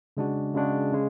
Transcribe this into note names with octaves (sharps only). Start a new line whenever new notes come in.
C#3 G#3 D4 F#4
C#3 G#3 D4 F#4
C#3 G#3